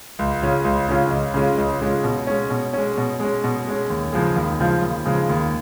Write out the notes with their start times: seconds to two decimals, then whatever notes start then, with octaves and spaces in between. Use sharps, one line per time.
0.19 C#2
0.42 C#3 G#3 C#4 F4
0.65 C#2
0.88 C#3 G#3 C#4 F4
1.11 C#2
1.34 C#3 G#3 C#4 F4
1.58 C#2
1.81 C#3 G#3 C#4 F4
2.04 B2
2.27 G#3 C#4
2.50 B2
2.73 G#3 C#4
2.97 B2
3.20 G#3 C#4
3.44 B2
3.67 G#3 C#4
3.90 D#2
4.13 C#3 F3 G#3
4.36 D#2
4.59 C#3 F3 G#3
4.82 D#2
5.05 C#3 F3 G#3
5.29 D#2